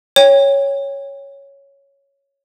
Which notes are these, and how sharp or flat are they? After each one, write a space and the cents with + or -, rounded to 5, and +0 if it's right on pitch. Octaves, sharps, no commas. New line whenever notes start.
C#5 +0 G5 +35